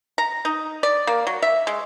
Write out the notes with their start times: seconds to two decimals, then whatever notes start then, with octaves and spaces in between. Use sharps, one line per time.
0.18 A#5
0.45 D#4
0.83 D5
1.07 A#3
1.27 F#3
1.42 E5
1.67 G#3